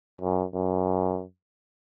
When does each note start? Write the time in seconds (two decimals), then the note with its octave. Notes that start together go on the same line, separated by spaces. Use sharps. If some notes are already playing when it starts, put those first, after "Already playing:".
0.21 F#2
0.54 F#2